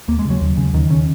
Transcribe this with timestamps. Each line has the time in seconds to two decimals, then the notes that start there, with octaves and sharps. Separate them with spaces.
0.08 D#2 A#3
0.19 G#3
0.25 C#3
0.30 F#3
0.41 D#2
0.57 C#3
0.74 D#2 D#3
0.90 C#3